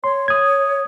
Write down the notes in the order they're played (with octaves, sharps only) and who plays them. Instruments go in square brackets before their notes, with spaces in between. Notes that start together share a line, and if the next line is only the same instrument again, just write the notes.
[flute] C#5 [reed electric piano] C6
[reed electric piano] D#6 G#6